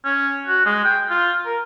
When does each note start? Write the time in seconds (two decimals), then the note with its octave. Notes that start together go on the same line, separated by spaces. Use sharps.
0.05 C#4
0.47 F#4
0.66 G#3
0.85 G5
1.10 F4
1.45 A#4